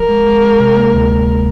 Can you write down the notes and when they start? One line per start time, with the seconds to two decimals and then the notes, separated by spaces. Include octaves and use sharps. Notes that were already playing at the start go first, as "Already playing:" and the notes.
Already playing: F3 A#4
0.09 G#3
0.27 G#3
0.43 G#3
0.60 C3
0.77 A#3
0.94 D2